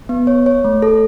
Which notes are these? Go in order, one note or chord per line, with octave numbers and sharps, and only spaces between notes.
B3
C#5
C#5
A3
A4